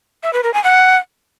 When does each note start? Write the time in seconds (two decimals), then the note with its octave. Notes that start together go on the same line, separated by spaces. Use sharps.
0.23 E5
0.33 B4
0.43 A#4
0.54 G#5
0.64 F#5